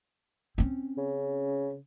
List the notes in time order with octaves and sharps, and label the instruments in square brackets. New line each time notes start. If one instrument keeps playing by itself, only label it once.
[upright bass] C4 C#4
[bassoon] C#3